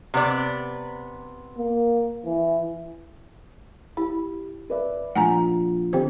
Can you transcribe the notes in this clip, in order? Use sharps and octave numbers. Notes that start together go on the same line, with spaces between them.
C3 B3 D5
A#3
E3
E4 G4
B4 D5 E5
A#1 F4 F#5 G#5 A#5
D3 C4 G4 C5